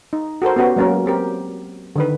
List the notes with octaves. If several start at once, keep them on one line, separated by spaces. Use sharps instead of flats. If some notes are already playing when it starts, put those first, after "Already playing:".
D#4
F#4 A4 A#4 C5
B3 C#4 F#4 G4 B4
F#3 G#3 A#3 C#4 A#4
C4 G4 A#4
D3 D#3 B4